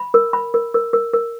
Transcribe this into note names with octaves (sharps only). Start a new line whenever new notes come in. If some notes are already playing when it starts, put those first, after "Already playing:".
Already playing: B5
A#4
B5
A#4
A#4
A#4
A#4